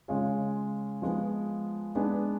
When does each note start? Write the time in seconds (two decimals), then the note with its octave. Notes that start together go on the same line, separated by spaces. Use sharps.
0.08 C#3 G#3 C#4 F4 G#4
1.02 F3 G#3 B3
1.95 G#3 B3 D4 G#4